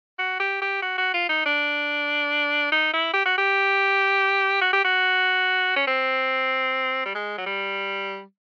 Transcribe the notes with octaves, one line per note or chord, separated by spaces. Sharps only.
F#4
G4
G4
F#4
F#4
F4
D#4
D4
D#4
E4
G4
F#4
G4
F#4
G4
F#4
C#4
C4
G3
G#3
F#3
G3